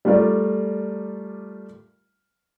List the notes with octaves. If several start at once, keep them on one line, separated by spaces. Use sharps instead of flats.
G3 A3 F4 A#4 D5